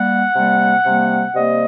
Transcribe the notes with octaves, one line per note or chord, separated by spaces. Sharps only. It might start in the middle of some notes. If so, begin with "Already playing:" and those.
Already playing: G3 A#3 F#5
C3 G3 A#3
C3 G3 A#3
C3 G3 A#3 D#5